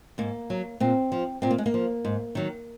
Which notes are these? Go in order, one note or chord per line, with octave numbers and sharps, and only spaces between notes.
G#2 A#3
F#3
A#2 C4
F3
A#2 C4
A#3
G#3
A#3
F3
G#2
D#3 F#3